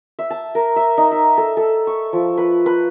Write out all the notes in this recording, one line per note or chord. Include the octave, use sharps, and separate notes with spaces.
E5
A5
A#4
E5
D#4
E5
A4
A4
C#6
F3
B4
B4